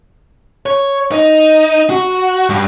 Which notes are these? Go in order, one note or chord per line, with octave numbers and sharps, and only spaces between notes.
C#5
D#4
F#4
G2